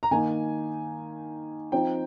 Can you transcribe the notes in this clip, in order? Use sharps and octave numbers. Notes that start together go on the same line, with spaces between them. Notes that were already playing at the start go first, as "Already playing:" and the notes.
A#5
D#3 A#3 D#4 G#5
F3 C4 D#4 G5